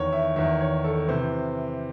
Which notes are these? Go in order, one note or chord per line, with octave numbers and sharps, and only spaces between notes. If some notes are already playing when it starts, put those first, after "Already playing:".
Already playing: E2 D#3 C#5
E5
E2 D#3 E5
C#5
A4
C3 E3 C5